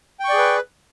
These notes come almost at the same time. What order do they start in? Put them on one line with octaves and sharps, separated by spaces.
G5 C#6 D5 G#4 B4